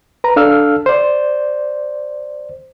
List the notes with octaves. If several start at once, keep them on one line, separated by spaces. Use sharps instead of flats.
B4 A#5
D4 A4 F5 E6 F6
C5 D5